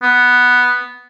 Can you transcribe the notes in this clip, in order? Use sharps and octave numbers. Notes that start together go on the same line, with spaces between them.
B3